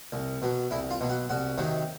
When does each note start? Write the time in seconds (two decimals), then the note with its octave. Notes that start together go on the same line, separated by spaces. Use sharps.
0.12 C2
0.42 B2 F#3
0.71 C2 E4
0.91 F4
1.00 B2 F#3
1.10 F#4
1.29 C2 F#4
1.58 C3 D#3 F#3